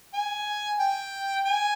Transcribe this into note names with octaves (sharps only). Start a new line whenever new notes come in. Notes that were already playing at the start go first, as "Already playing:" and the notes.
G#5
G5
G#5